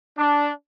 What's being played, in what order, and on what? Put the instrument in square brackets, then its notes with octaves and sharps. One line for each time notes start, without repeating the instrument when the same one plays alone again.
[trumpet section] D4